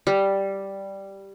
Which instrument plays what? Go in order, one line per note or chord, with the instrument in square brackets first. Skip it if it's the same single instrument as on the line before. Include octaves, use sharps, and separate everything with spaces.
[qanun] G3